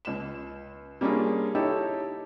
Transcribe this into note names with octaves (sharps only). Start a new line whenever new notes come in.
C#2 E7
G3 A#3 C#4 D4 F4 G#4
D#4 E4 G4 A4 C#5